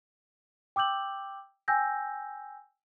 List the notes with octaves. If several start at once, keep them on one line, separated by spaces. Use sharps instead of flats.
G5 D6 E6 G6 F#7
G5 G#5 E6 G6 A#6